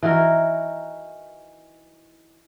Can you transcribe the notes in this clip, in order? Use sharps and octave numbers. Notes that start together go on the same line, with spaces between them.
E3 D#4 F#4 A#4